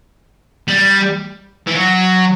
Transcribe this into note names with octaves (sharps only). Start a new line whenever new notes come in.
G3
E3
F#3